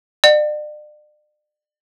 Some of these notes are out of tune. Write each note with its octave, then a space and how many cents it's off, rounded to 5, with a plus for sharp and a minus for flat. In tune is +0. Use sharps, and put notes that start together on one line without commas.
D5 +40 F#5 +0